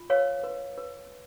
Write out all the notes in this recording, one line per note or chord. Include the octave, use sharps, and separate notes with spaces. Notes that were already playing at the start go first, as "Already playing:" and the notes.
Already playing: F4
B4 C#5 F5
B4
B4